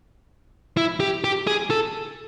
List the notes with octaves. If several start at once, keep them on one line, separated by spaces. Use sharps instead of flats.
E4
G4
G4
G#4
A4